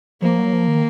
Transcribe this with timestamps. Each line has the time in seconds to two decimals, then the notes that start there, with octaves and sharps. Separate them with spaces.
0.22 F3 A#3
0.38 F#3
0.53 F3
0.68 D#3